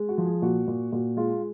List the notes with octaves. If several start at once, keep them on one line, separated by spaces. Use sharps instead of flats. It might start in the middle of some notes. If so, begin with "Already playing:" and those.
Already playing: G#3
F#4
F3
G#4
A#2 F#4
A#2
A#2 F#4
G#3 F4